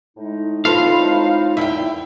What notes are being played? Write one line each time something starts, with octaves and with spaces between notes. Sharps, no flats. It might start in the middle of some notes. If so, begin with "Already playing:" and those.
A2 G#3 D#4
C4 F4 A4 B4 F5 C6
E2 E4 E5 G5